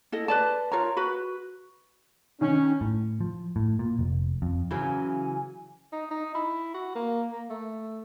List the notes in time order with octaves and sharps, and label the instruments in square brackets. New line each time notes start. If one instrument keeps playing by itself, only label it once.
[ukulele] E4 A4 D#5
B4 D5 A5
F4 A#4 C#5 A#5
F#4 B4 B5
[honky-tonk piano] D#3 [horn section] C#4
[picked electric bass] A2
F3
A2
A#2
F1
F2
[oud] C#3 E3 F#3 [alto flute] G#5
[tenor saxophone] D#4
D#4
E4
F#4
A#3
A#3
A3